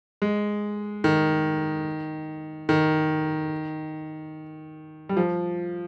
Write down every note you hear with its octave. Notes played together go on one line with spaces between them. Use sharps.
G#3
D#3
D#3
G3
F3